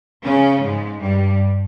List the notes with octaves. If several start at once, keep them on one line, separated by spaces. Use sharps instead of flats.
C#3 C#4
G#2 G#3
G2 G3